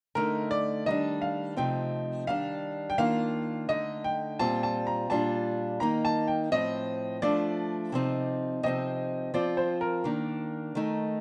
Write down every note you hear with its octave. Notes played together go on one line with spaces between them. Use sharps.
D3 A3 D#4 A#4
D5
D#3 G3 D4 D#5
F5
C3 F3 A3 C4 D#4 G5
D#3 G3 D4 F5
G5
D#3 A#3 D4 F4 F5
D3 A3 D#4 D#5
G5
A#2 G3 C4 F4 A5
A5
A#5
A#2 G3 D4 F4 A5
D#3 A#3 D#4 A#5
A5
G5
A2 F3 C4 D#5
F3 A3 D4 F4 D5
C3 F3 C4 D#4
C3 F3 C4 D#4 D#5
F3 C4 F4 D5
C5
A#4
D#3 A#3 D4
D#3 A3 D#4